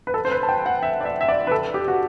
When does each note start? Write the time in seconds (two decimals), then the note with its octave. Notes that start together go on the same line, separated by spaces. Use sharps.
0.07 B4
0.14 A4
0.25 C5
0.31 B4
0.43 A5
0.49 G5
0.66 F#5
0.83 E5
1.01 D5
1.05 E5
1.21 E5
1.28 D5
1.47 B4
1.52 A4
1.74 G4
1.88 F#4